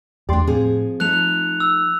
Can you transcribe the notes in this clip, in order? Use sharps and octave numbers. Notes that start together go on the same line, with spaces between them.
E2 A3 D4 G4 D5 C6
A2 F3 C4 G#4
F3 A3 D#4 F#6 F7
E6